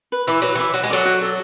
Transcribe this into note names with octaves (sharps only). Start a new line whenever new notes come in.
B4
E3 E5 B5 D6
F#3 B4
E3 E5 B5 D6
F#3 F#4
G#3
F#3 A4 D5
F#4
A4 D5